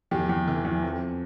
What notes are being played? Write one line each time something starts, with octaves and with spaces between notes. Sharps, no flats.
E2 G4
E2
E3
E2
F2